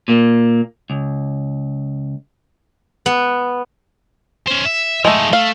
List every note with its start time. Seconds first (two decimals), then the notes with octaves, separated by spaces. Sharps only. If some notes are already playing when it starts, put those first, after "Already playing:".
0.08 A#2 A#3
0.90 C#2
3.06 B3
4.47 C#4 C5
4.65 E5
5.05 F3 G#3 A3 D#4
5.33 A3 F5